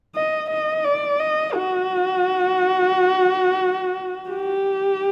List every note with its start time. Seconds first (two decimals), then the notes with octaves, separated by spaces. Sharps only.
0.15 D#5
0.50 D#5
0.85 D5
1.20 D#5
1.54 F#4
4.29 G4